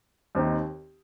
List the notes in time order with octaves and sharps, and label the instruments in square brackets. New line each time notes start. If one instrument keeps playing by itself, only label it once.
[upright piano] D#2 D#3 C4 D#4